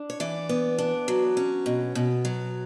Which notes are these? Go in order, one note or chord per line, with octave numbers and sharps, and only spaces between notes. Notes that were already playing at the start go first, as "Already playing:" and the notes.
Already playing: D4
C#5
E3 D5
B3
D4
F#3
C#4
B2
B2
F#3